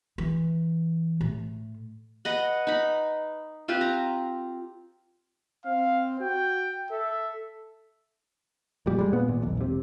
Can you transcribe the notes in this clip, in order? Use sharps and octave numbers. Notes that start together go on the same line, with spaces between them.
E3
A2
B4 D#5 F#5
D#4 B5
C4 F4 G4 B4
A#5
C4 F5
F#4 G5
A4 E5
F1 A#2 G3
G3 G#3
A#2 B3
G#1 A#2
D#1 B1
E1 C3